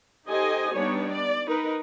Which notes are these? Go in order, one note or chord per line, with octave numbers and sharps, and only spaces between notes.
D#4 G4 A4 C5 D#5 G#5
G3 B3 D4 D#4 C#5
D5
D#4 A#4 B4